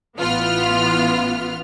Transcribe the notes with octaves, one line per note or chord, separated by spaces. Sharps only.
A1 E3 B3 F4 F6